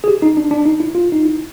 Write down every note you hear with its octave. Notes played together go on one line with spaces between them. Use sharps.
G#4
G4
D#4
D4
D4
D#4
E4
F4
D#4
E4